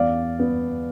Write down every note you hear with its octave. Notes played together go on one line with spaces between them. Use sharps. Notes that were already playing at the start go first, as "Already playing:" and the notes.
Already playing: E2 D5 F5
B3